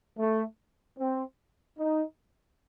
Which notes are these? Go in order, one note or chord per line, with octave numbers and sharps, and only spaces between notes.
A3
C4
D#4